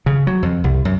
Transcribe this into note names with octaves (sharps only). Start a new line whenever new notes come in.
C#3
F#3
F2
C2
F#2